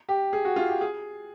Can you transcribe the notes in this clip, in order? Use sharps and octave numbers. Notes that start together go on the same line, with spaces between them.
G4
G#4
F#4
F4
G4
G#4